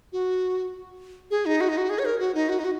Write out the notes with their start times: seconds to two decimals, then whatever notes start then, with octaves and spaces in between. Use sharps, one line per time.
0.13 F#4
1.31 G#4
1.46 D#4
1.61 F#4
1.69 D#4
1.77 F#4
1.90 G#4
1.99 C#5
2.05 A#4
2.19 F#4
2.35 D#4
2.49 F#4
2.59 D#4
2.64 F#4